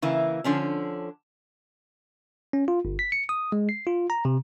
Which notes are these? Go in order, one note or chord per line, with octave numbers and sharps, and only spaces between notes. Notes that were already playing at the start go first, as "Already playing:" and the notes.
C#3 E3 A#3 E4
D3 F3 C#4 D4
C#4
F4
G1
B6
C#7
D#6
G#3
C7
F4
A#5
C3